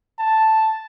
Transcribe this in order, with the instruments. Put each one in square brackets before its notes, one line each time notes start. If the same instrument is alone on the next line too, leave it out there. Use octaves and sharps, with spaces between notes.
[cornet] A5